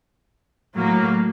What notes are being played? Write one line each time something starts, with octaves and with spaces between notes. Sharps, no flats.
A2 F#3 A#3